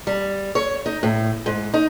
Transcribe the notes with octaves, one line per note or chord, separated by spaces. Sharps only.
G3
C#5
D#4
A2
G#2
D#4